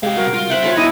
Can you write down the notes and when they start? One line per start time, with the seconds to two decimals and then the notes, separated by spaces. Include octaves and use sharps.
0.03 C3 G#3 G4 F5
0.17 G3 F#4 A#4
0.34 F4
0.50 C5 E5 F#5 G5
0.63 C#5 A5 B5
0.77 B3 D4 E4 D#5